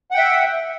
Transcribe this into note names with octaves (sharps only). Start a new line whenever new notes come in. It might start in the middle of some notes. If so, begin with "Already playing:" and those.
E5 F#5 G5